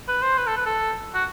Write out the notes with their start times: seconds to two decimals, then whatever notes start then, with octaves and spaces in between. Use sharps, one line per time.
0.08 B4
0.22 C5
0.38 B4
0.47 A4
0.56 B4
0.66 A4
1.14 F#4